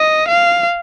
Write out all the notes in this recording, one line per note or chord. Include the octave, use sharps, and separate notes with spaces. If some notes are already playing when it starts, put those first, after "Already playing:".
Already playing: D#5
F5